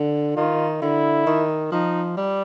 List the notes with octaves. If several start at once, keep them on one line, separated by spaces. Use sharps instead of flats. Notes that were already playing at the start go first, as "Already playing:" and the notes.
Already playing: D3
D#3 F4
D3 E4
D#3
F3 D#4
G3